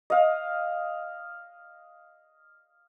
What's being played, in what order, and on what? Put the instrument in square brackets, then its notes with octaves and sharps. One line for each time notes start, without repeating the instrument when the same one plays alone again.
[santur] D#5 F5